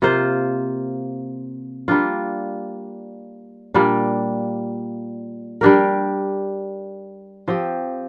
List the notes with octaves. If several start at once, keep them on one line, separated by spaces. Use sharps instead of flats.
C3 A#3 F4 C5
G3 A#3 D4 F4
A#2 G3 A#3 D4
G3 D4 G4 A#4
F3 C4 G4